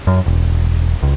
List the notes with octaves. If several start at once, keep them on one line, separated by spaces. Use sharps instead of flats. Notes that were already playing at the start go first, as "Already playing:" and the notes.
F#2
E1
C#2